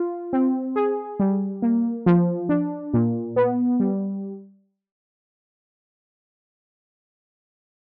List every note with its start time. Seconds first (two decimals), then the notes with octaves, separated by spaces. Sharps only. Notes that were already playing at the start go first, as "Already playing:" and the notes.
Already playing: F4
0.33 C4
0.76 G#4
1.19 G3
1.62 A#3
2.06 F3
2.49 D4
2.94 A#2
3.36 B3
3.80 G3